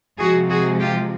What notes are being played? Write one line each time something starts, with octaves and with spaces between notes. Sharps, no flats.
C3 F3 G#3 F#4 G#4
F#4 G#4
F4 G4